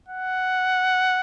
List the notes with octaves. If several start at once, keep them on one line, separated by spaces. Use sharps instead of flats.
F#5